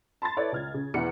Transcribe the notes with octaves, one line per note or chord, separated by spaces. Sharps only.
A5 B5 C6 A6
E4 A4 B4 C#5 D5 E5
C#2 F6 G#6
C#3
E2 B2 E3 D5 F#5 C#7